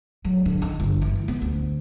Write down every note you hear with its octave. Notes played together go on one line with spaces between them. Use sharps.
F#3
D3
D#3
G1
E3
B3
D2